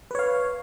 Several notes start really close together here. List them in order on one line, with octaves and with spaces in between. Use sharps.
B4 C#5 F5